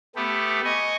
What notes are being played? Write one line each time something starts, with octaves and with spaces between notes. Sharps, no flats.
A3 B3 G4
D#5 G#5 C#6